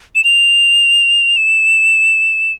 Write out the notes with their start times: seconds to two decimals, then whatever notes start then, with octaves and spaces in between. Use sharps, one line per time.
0.15 E7
0.24 F7
1.37 E7